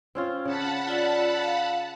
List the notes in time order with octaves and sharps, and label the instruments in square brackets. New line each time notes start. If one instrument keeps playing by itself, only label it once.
[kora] C4 C#4 F4
[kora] C#3 [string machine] F#5 A5 B5
[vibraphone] F4 D5 E6
F5